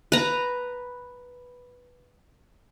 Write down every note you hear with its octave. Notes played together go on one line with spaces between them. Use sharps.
B4 A#5